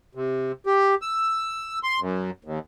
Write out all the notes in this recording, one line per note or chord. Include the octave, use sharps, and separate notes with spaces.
C3
G4
E6
C6
F#2
D#2